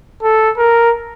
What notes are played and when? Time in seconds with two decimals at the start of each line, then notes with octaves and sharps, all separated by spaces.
0.23 A4
0.58 A#4